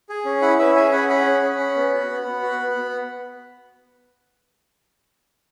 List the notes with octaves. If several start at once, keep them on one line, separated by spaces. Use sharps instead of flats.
G#4
C#4
E4 F#5 B5
C#4 B4 E5
G#4 E5 G#5
C#4 F#5 B5
G#4 F#5 B5
C#4
C#4
C#4
B3
F#4
B3
B3
F#4
B3
B3